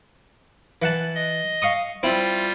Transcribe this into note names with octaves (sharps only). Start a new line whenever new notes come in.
E3 F#5 A5
D#5
F5 C#6 D#6
G3 C4 E4 F4